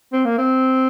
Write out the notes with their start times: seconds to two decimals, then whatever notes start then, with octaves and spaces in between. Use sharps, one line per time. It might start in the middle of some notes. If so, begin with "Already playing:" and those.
0.13 C4
0.25 A#3
0.38 C4